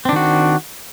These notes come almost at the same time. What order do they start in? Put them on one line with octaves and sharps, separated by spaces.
C4 D4 D#3 F#4